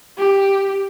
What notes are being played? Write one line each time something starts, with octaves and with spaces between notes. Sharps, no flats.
G4